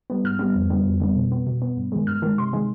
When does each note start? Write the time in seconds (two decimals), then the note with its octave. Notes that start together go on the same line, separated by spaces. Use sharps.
0.10 G3 B3
0.24 G#2 F6
0.39 G3 B3
0.55 F2
0.70 D3 G3 B3
0.86 F2
1.00 D3 G3 B3
1.16 B2
1.32 B3
1.47 B2
1.62 B3
1.77 G2
1.92 D#3 G#3
2.07 G2 F6
2.22 D#3 G#3
2.38 C3 C6
2.53 D#3 G#3